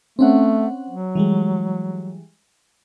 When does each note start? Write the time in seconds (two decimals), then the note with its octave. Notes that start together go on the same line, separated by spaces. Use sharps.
0.19 A3 C4 C#4 F#5
0.89 F#3
1.15 E3 G3 G#3